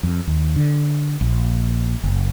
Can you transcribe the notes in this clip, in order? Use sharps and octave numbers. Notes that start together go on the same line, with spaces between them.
F2
D#2
D3
A#1
F#1